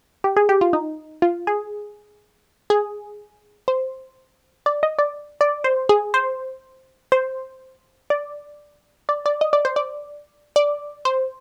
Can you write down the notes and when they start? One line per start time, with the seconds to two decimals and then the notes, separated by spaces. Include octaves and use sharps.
0.24 G4
0.36 G#4
0.49 G4
0.61 F4
0.73 D#4
1.22 F4
1.47 G#4
2.70 G#4
3.68 C5
4.66 D5
4.83 D#5
4.99 D5
5.41 D5
5.64 C5
5.89 G#4
6.14 C5
7.12 C5
8.10 D5
9.09 D5
9.26 D5
9.41 D#5
9.53 D5
9.65 C5
9.76 D5
10.56 D5
11.05 C5